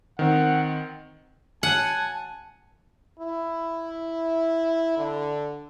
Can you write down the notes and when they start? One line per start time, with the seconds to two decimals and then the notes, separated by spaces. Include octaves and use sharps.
0.19 D#3 C4 F#5
1.63 F#5 G#5 A5
3.19 E4
4.97 D3